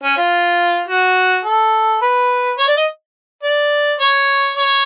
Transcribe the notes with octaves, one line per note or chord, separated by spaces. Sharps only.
C#4
F4
F#4
A4
B4
C#5
D5
D#5
D5
C#5
C#5